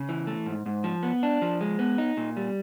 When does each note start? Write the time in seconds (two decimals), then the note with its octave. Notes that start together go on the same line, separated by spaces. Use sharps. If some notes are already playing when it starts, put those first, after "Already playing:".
Already playing: C#3
0.09 E3
0.27 A3
0.46 G#2
0.66 G#2
0.84 F3
1.03 B3
1.23 D4
1.42 F3
1.61 G#3
1.79 B3
1.98 D#4
2.17 A#2
2.37 G3